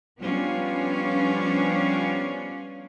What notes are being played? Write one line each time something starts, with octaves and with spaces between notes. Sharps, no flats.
F3 G3 B3 C#4 D4 F4